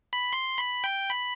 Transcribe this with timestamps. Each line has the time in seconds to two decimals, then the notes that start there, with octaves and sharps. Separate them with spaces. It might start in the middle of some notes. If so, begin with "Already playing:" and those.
0.13 B5
0.33 C6
0.58 B5
0.84 G5
1.10 B5